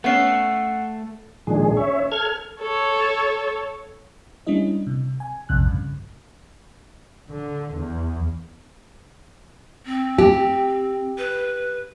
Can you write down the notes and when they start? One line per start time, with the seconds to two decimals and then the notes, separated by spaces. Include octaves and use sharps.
0.04 A3 B3 C#4 F#5 C7
1.47 A#2 D#3 F3 G#3 D4 G#4
1.77 C#4 C#5 E5
2.12 A4 F6 G#6
2.61 A4 C#5
4.47 G3 C#4 D4 E4 D#5
4.87 C3
5.20 G#5
5.49 A#1 F2 C3 F#6
5.66 G2 C#3
7.30 D3
7.74 E2
9.85 C4
10.18 G4
11.18 B4